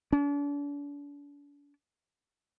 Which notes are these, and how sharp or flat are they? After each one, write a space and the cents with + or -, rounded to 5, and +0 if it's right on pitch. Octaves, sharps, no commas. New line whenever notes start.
D4 -40